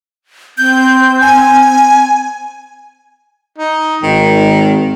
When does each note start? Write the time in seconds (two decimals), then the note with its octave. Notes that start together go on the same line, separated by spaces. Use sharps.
0.58 C4 G6
1.21 G#5
3.58 D#4
4.02 G#1 D#3